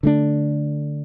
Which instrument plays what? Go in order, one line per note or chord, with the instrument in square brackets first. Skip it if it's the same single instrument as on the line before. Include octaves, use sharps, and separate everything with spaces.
[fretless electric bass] D3 A3 D4